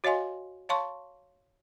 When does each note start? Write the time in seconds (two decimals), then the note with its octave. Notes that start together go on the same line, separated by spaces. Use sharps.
0.04 F#4 C#5 D#5 F5 G#5 C6
0.69 C#5 F5 A5 C6 C#6